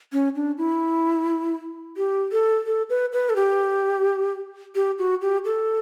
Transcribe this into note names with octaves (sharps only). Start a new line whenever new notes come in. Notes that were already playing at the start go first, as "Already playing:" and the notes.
C#4
D4
E4
G4
A4
A4
B4
B4
A4
G4
G4
F#4
G4
A4